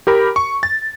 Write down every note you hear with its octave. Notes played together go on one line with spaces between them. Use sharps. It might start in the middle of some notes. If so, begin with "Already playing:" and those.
G4 A#4 B5
C#6
A6